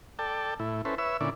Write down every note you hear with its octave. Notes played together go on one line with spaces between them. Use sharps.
A4 D5 G5 A5
A2 E4
C#4 E4 A4 B4 C5
B4 C#5 E5 E6
A#2 D3 C#4 E4 D5